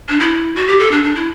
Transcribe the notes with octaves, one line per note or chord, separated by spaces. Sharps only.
D4
E4
F#4
G4
A4
D4
D4
E4